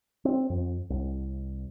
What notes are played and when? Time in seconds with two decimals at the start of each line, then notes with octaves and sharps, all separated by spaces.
0.25 C4
0.50 F2
0.90 C2